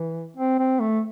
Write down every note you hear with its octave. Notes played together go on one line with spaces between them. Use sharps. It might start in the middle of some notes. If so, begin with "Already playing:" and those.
Already playing: E3
C4
C4
A3